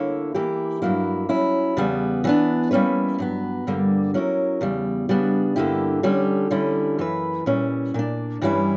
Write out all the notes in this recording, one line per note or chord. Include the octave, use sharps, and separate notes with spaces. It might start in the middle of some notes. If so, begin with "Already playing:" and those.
Already playing: D3 A#3 E4 C#5
E3 A#3 E4 G4
G2 F#3 A#3 E4
F#3 C#4 E4
E2 C#3 G3 B3
E3 G3 B3 D4
G3 A#3 C#4 E4 B4
G2 F#3 B3
G2 D3 G3 A#3
F#3 C#4 E4 A#4
E2 C#3 G3
C#3 G3 B3 D4
G2 D3 A#3 E4 G4
D3 G3 C#4 G4
D3 G3 C#4 E4
F#2 E3 A#3 E4 B4
A#2 G3 C#4 E4 B4
A#2 A#3 D4
G2 E3 G3 C#4 E4